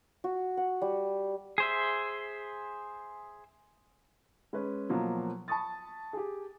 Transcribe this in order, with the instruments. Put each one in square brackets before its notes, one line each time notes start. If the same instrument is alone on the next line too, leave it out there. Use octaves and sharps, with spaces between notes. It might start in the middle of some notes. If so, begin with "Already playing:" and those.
[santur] F#4
F#5
G3
[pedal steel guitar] G#4 C5 E5
[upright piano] G#3 C#4 B4
B2 F3 F#3 A#3
A5 B5 C#6 D#6 A6
G4 G#4